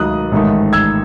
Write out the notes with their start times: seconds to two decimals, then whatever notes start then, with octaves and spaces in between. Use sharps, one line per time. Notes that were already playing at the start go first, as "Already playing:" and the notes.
Already playing: C#2 D#3 F#3 A3 D#6 F#6
0.32 A1 G#2 D#3 A3
0.73 E6 G#6